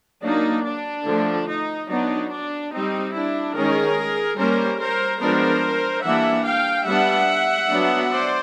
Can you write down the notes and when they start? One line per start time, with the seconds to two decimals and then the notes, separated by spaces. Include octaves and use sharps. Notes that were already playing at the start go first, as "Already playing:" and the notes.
0.23 F#3 A#3 D4 D#4
0.64 D4
1.06 D3 F3 A3
1.48 D#4
1.89 F#3 B3 D4 D#4
2.31 D4
2.72 G3 C4 D#4
3.13 D4 E4
3.55 D#3 G#3 C#4 G#4 A#4
4.38 G3 A#3 C#4 A#4 C5
4.80 A#4 C5
5.21 F3 G#3 B3 D4 A#4 C5
6.04 E3 G3 A#3 D4 E5 F#5
6.46 F5 G5
6.87 G3 B3 D4 E5 F#5
7.70 F#3 B3 D4
8.12 C5 D5